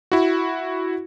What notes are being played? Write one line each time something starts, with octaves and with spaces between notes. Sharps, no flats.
E4 F#4